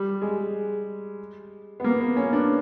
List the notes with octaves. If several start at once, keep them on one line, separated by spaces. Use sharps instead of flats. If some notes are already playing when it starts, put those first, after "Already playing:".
Already playing: G3
G#3
B3
A#3
B3
C#4
D4